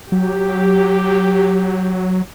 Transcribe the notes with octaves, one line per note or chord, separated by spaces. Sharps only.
F#3 G4